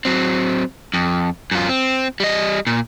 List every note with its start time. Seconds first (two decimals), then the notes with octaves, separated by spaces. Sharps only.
0.05 F#3 C4
0.94 F2
1.51 F#2 F4
1.69 C4
2.20 G3 D#5
2.67 A#2